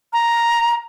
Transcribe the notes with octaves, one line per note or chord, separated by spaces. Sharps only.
A#5